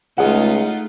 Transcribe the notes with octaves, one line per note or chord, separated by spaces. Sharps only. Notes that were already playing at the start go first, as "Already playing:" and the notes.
C#2 A3 D#4 F4 G#4 F#5